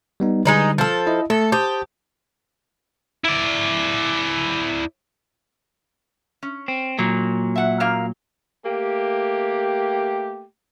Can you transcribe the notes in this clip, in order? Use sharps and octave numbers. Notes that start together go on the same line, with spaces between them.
G3 B3 D#4
D3 G3 G#3 D#4 B4
F3 A4
E4 D#5
A3 A4
G4 C5 A5 D#6
E4 D5
C#4
C4
A#2 F#3 A#3
E5 F#5
F#2 A#3 F5
A3 A#3 G4